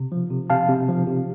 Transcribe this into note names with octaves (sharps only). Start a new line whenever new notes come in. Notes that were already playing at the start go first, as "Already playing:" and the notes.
Already playing: C3
F3
C3
C3 F5 A5
C3
F3
C3